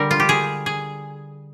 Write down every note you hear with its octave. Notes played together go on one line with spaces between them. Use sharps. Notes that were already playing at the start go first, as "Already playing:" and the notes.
Already playing: D3 G3 A#4
F4
G4
G#4
G#4